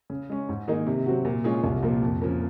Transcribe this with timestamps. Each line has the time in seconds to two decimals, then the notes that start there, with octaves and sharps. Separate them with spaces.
0.10 C#3
0.30 G#3 C#4
0.49 G#2
0.68 D#3 A#3 D#4 G#4
0.87 C3
1.06 F#3 C4 F#4
1.25 A#2
1.44 G#3 C#4 F4 G#4
1.64 C2
1.83 A#2 F3 A#3
2.02 F2
2.22 C#3 F3 A#3